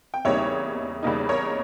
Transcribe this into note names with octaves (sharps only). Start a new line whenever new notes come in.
G5
E2 C#3 G3 A#3 D#4 C#5 E5
E2 C#3 G3 A#3 D#4
A#4 C#5